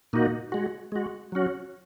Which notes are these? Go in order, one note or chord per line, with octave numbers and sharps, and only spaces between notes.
A#2 A#3 D#4 F#4
G#3 F#4
G#3 F#4
F#3 C#4 F#4